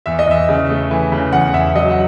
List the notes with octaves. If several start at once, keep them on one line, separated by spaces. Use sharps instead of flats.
E2 E5
D#5
E2 E5
C#3
A3
E3
C#3
E2 F#5
E2 E5
F#3 D#5
F#5